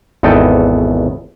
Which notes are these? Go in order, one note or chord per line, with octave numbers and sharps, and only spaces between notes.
G#1 E2 B3 A4 D#5 G5